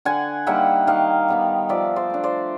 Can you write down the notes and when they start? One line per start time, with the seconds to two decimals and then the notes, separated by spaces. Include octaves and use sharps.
0.05 D3 F#5 G#5
0.47 G3 A#3 D#4 E5 F#5
0.87 D#3 D#5 F5
1.28 G3 B3 D#4
1.69 F3 D5 E5
1.96 C5 D5
2.10 A3 D4
2.23 C5 D5